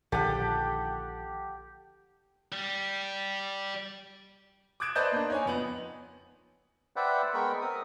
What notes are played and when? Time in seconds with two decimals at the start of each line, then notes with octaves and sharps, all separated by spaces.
0.12 A#1 D3 D#3 G4 A4 F#5
2.52 G3
4.80 D6 D#6 F#6 G#6 D7 E7
4.95 B4 C5 D5 D#5 A5 G6
5.12 A#3 D4
5.30 D#4 C#5 G#5
5.46 F2 B3 F#7
6.96 B4 C5 D5 E5 F#5 G5
7.34 G#3 B3 A#4 G5 B5 C#6
7.61 C4 A#4 D#6